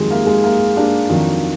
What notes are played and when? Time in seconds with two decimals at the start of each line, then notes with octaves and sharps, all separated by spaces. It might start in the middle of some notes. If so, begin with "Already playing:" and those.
Already playing: F2 D#3 F#3 G#3
0.11 A#3
0.26 G#3
0.44 A#3
0.76 A#3 D4
1.09 F2 D#3 F#3